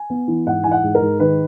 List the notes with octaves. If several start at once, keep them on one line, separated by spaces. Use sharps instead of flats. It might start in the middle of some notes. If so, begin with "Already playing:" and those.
Already playing: G#5
B3
E3
G#2 F#5
E3 G#5
F#5
G#2
A#4
G#2
D#3 B4